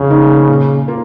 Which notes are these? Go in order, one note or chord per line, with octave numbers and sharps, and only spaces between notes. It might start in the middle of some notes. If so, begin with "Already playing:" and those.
Already playing: F2 C#3
D#3 A#3 D#4
A#2
A#3 F4